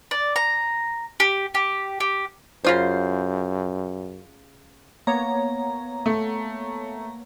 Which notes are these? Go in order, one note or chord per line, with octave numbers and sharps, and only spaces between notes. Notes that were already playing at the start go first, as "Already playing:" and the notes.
D5
A#5
G4
G4
G4
F#2 C#3 F4 C5
A#3 B3 C#5 A#5
A3